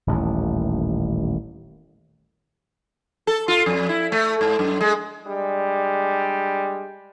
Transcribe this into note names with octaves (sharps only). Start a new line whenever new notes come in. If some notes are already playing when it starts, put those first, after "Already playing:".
D#1 A1 D#2
A4
F4
F2
E4
A3
G#2
F#2
G#3
G3 G#3 D4